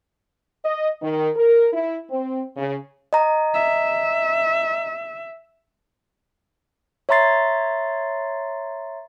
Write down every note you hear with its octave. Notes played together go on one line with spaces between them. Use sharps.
D#5
D#3
A#4
E4
C4
C#3
D#5 A#5
E5
C#5 E5 A#5 C6 A6 C7